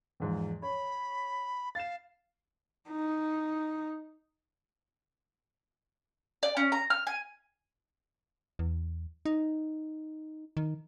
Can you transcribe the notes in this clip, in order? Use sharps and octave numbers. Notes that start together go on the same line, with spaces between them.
E2 G#2 F3
C#5 B5
F5 A6 E7
D#4
D5
C#4
A#5
F6
G#5
E2
D#4
D#3